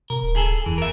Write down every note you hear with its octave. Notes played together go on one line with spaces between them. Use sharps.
B2 A#4
D1
G#4 A4
E2 E3
A#4 E5